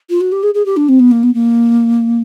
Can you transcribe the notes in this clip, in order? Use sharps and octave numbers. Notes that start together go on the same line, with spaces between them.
F4
F#4
G4
G#4
G#4
G4
D4
C4
B3
A#3
B3
A#3